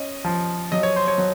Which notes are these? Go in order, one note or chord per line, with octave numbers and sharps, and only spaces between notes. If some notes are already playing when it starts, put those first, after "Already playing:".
Already playing: C#4 D#5
F3
F#3 D#5
C#5
C5
C#5
F#3